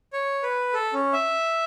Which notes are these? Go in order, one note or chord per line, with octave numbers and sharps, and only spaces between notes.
C#5
B4
A4
C#4
E5